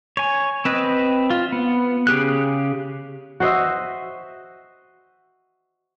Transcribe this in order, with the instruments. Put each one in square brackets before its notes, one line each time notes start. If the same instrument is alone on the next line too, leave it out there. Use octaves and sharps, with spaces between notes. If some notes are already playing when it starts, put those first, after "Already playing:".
[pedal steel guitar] C#5 G#5
C4 B4 D#5
F4
B3
C#3 G4 G#4 F#6
[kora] F#4 C5 D#5 E5